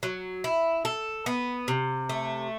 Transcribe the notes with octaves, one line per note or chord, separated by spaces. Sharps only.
F#3
E4
A4
B3
C3
A3